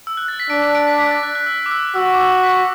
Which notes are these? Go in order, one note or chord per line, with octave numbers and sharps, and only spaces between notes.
E6
F#6
A6
B6
D4 D7
B6
D7
B6
B6
A6
F#6
F#6
E6
D6
E6
F#4 E6
D6
E6
B6